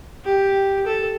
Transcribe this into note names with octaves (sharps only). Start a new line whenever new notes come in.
G4
A4